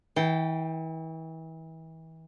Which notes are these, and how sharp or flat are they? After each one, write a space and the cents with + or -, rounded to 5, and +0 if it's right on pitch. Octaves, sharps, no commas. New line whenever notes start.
E3 -35 G5 -15